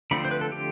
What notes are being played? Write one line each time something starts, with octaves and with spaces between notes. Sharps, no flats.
D3 F3 A3 C4 B5
C5
B4
A4
G4